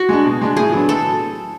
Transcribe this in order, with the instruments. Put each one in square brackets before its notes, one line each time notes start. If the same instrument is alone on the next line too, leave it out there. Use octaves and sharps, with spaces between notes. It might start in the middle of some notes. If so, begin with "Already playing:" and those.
Already playing: [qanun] F#4
[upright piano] G#3 D4
B2
G#3 D4
[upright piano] A2 [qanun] G#4
[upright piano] F#3 B3 D4
[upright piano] A2 [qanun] A4